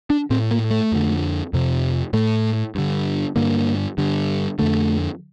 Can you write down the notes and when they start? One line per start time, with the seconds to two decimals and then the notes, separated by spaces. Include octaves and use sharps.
0.10 D4
0.30 A2 C4
0.51 A#3
0.70 A3
0.92 F2 D3
1.53 F2 C3
2.13 A2 A3
2.75 G2 D3
3.36 G2 D3 A#3
3.98 G2 D3
4.59 F2 D3 A3